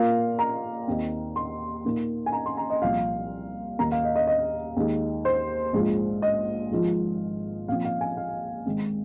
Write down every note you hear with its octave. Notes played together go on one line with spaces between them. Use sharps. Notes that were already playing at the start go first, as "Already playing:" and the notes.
Already playing: A#2 A#3 F4 F5
A#5
D#2 D#3 C4
C6
A#2 A#3 D#4
G#5
A#5
C6
A#5
D#5
C2 A#2 F3 F5
D#2 D#3 A#3 A#5
F5
D#5
D#5
D#5
D#2 D#3 G#3 D#4
C5
A#1 G#2 G#3 F4
D#5
G#1 G#2 F3 G#3 F4
A#2 F3 C4 F4 F5
F5
G#5
F5
G#1 G#2 D#3 C4